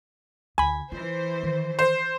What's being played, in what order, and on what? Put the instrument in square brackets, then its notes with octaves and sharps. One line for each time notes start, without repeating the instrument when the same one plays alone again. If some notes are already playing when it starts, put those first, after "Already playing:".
[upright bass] D2 [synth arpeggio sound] G#5 B5
[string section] E3 C5 [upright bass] F4
[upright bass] D#3
[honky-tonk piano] C5